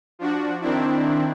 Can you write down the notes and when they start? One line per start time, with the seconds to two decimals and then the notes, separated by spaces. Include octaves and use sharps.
0.19 F3 D4 F#4
0.61 D#3 C4 D4 E4